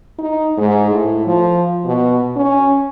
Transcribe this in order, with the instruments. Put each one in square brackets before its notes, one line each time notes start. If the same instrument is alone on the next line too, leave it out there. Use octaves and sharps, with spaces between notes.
[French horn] D#4
G#2
A2
F3
B2
C#4